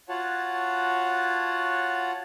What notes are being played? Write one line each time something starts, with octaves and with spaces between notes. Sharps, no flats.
F4 F#4 C#5 F#5 A5